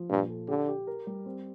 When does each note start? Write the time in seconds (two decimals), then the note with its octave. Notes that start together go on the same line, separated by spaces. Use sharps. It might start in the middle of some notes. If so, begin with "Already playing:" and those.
Already playing: F3
0.10 G2 A#2
0.29 A4
0.48 D3 G4
0.68 G4
0.87 A#4
1.07 G3
1.26 C4